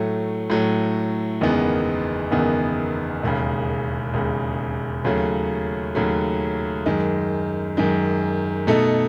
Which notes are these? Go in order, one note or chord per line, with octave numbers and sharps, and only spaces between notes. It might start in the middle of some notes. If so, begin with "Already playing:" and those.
Already playing: A2 F#3 A3
A2 F#3 A3
F#1 E2 D#3 G#3 B3
F#1 E2 D#3 G#3 B3
E1 D#2 C#3
E1 D#2 C#3
D#2 C#3 F#3 A3
D#2 C#3 F#3 A3
F#2 D#3 G#3
F#2 D#3 G#3
B2 A3 D#4 A4